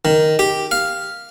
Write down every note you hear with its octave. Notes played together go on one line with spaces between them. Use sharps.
D#3
G4
F5